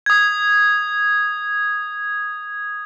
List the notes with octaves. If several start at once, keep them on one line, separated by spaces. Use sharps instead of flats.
D#6 G#6